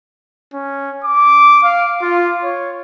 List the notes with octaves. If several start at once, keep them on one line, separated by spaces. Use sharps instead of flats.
C#4
D6
F5
F4
C#5